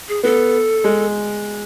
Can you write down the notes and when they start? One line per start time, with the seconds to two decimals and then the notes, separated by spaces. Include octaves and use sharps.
0.09 G#4
0.23 B3 A4
0.84 G#3